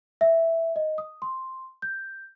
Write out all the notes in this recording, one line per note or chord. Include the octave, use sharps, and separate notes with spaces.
E5
D#5
D#6
C6
G6